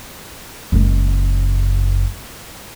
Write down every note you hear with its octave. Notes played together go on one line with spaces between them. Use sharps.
F#1 G#3